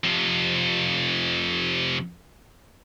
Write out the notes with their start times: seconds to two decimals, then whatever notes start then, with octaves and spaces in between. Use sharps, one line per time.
0.04 F2 C3